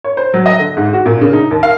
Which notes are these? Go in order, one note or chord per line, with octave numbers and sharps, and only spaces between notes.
C#5
C5
F#3
D#5
D3
G#2
F#4
A#2
C#3
D#4
D#2
F5